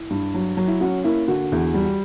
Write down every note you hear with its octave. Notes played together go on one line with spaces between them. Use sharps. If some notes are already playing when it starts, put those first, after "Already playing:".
Already playing: E4
G2
F#3
F#3
E4
C#4 F#4
A#3 E4
D3 F#4
E2
G3